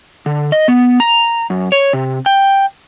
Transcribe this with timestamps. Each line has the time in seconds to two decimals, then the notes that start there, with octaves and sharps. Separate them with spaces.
0.26 D3
0.52 D#5
0.68 B3
1.00 A#5
1.50 F#2
1.72 C#5
1.93 C3
2.26 G5